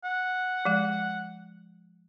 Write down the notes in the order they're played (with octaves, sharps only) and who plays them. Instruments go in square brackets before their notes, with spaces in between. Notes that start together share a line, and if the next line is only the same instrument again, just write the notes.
[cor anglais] F#5
[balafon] F3 G#3